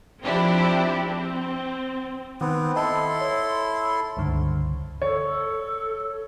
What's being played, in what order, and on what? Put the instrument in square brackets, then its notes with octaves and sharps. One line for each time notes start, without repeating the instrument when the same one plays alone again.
[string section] F3 C4 D4 E4 G4
C4
[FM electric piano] D#3 [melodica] B3 C4
[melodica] E4 A4 C6 [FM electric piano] D#5 A5
[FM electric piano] C#5
C#2 G2 D3
[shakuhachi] A4 [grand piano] C#5